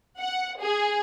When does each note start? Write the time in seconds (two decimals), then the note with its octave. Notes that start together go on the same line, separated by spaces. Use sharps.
0.20 F#5
0.61 G#4